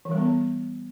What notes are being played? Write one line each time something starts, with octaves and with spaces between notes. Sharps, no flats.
E3
G3
B3